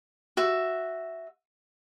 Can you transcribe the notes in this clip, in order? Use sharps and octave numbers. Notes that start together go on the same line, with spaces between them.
F#4 E5